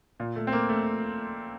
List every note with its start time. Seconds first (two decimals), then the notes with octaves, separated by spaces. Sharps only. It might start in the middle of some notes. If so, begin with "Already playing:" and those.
0.20 A#2
0.36 A3
0.47 C4
0.52 A#3
0.69 A3